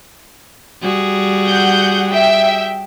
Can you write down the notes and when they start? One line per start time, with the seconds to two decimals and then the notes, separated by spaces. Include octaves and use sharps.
0.81 G3 F#4 G#4
1.44 F#5 G6
2.10 E5 G5